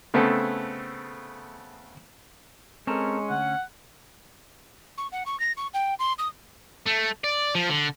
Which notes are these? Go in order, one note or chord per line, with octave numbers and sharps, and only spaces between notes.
C#3 A3 B3 C4 A4
G#3 C4 C#4 A4 A#4
D2 F#5
C#6
F#5
C#6
A#6
C#6
G5
C6
D#6
A3
D5
F3
D3